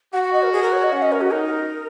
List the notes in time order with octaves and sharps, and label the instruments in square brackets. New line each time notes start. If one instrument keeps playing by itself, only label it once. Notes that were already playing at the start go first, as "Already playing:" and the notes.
[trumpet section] F#4 [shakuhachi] F#5
[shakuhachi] F#5
D#5
A#4
G#4
A#4
C#5
D#5
[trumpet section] C#4 [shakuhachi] F#5
[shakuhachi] D#5
A#4
F#4
[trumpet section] D#4 [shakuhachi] A#4